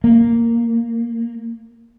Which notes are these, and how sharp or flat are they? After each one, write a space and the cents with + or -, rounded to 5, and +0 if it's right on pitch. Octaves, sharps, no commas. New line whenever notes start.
A#3 -5